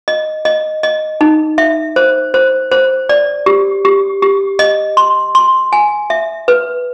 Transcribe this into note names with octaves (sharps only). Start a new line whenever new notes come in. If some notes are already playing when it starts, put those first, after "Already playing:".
D#5
D#5
D#5
D#4
E5
C5
C5
C5
D5
G4
G4
G4
D#5
C6
C6
G#5
E5
B4